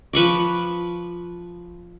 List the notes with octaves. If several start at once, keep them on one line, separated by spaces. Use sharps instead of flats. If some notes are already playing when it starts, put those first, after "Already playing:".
F3 B4 C#6 D6